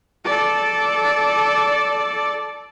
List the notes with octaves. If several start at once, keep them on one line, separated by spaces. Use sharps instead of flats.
A4 D5